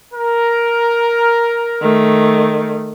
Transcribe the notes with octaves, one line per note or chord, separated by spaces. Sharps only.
A#4
D#3 A3